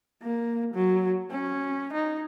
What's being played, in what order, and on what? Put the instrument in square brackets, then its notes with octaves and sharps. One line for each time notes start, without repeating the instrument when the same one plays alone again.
[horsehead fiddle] A#3
F#3
C#4
D#4